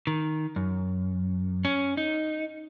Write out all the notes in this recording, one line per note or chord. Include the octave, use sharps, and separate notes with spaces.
D#3
F#2
C#4
D#4